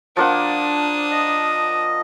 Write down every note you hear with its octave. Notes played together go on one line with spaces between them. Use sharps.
F3 A#3 D4 F#5 D#6
D#5